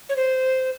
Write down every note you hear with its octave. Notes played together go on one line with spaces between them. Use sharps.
C#5
C5